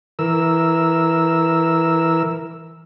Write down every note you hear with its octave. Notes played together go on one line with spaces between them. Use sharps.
E3 A#4 E6